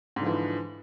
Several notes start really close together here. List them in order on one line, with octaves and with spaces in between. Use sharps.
G#2 D3 F3 E3